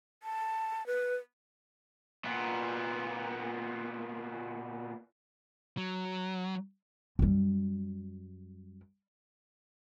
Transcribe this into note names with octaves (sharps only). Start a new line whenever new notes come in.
A5
B4
A#2 B3
F#3
F#2 G3